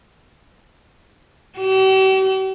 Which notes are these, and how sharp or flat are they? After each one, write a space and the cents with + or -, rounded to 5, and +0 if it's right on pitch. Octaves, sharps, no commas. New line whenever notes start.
G4 -45